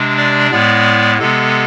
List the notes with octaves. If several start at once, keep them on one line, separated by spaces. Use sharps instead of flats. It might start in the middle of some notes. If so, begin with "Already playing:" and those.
Already playing: C3 G#3 D4
D5
A2 G#3 B3 D5
C3 G#3 B3 A4